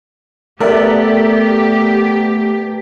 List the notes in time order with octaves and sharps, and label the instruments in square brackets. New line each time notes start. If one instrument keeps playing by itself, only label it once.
[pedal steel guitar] A3 B3 [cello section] G4 [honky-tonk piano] A#4 D5 E5